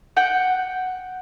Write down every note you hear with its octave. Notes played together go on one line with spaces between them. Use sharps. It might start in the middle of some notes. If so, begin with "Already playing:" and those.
F#5 G5